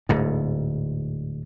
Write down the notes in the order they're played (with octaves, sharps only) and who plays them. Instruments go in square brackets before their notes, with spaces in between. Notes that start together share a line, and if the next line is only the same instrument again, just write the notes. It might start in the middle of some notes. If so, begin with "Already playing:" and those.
[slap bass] D1 D2 G#2